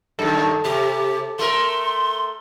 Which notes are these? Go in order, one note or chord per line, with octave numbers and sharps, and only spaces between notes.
F#2 D#3 A4
C3 G4
A3 A#4 C6